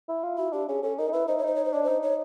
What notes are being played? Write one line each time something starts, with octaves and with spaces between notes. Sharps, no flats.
E4
F4
E4 F#4
D4 G4
C#4 G#4
C#4 A4
D#4 A#4
D#4
E4 B4
D#4 C5
C#5
D#4 C5
C#5
C5
D4 C#5
C5
D#4
C#5